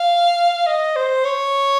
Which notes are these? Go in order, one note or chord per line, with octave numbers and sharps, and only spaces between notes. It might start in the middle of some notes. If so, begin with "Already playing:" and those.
Already playing: F5
D#5
C5
C#5